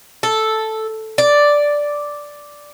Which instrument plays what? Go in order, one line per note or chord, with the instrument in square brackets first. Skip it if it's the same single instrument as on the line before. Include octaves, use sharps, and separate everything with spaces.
[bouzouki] A4
D5